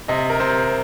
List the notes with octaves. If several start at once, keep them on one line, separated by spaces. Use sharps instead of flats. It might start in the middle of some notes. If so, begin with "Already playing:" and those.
C3 D#5
A#4
C3 C5